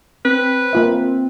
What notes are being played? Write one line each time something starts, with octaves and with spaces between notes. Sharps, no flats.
C4 B4
A#3 F4 E5